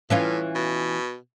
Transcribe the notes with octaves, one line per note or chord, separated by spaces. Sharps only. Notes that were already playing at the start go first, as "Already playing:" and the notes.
A2 E3 C#4 F4
B2